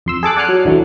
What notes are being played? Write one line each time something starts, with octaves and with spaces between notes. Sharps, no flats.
F2 C6 E6
G#4 A4 D6 F#6
D5 F#5 G#5 F6 F#6 C7
F#3
D2 D3 E3 F#3 A3